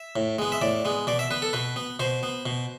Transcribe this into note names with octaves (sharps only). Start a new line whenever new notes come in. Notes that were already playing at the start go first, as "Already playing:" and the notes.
Already playing: E5
A2
G#3 B3
E5
A2 D5
G#3 B3
B2 D5
E5
B3 B4
A4
B2 B4
B3
B2 C5
B3
B2